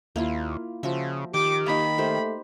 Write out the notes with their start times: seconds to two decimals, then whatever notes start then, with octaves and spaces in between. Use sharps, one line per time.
0.16 D#2 A#3 E4 F4
0.83 C#3 F3 F#4 E5
1.34 D#3 G4 G5 D6
1.66 A#3 D#4 B5
1.98 A3 G4 C5